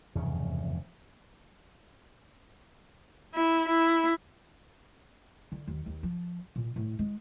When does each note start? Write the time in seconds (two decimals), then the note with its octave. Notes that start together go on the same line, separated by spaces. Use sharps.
0.15 F1 E2 G2 C#3
3.34 E4
3.68 E4
5.52 D3
5.67 D#2
5.86 D#2
6.03 F3
6.56 A#2
6.76 A2
6.99 G#3